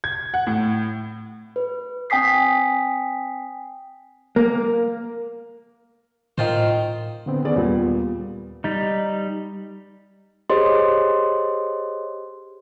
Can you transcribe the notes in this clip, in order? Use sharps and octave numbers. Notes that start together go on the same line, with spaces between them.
G#6
F#5
A2
B4
C4 G5 G#5 D#6 B6 C7
A#3
A2 D#3 F4 C5
D3 B3 C4
D#3 B3 C#4 G#4 D5
D#2 A#2 G3 B3
G3 D#4
G4 G#4 C5 C#5 D#5 C6